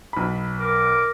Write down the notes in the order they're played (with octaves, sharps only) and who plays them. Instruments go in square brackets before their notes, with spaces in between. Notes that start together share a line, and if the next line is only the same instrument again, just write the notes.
[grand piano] B1 B5
[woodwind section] A#4 D6